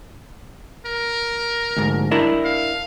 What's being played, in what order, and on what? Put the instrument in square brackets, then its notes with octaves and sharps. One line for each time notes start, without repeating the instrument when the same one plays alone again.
[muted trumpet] A#4
[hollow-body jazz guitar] D2 G#2
D4 E4 A#4
[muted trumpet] F5